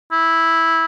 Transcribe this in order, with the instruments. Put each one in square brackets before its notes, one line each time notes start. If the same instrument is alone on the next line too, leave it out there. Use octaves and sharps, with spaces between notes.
[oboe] E4